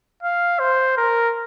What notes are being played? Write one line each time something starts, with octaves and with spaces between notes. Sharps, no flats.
F5
C5
A#4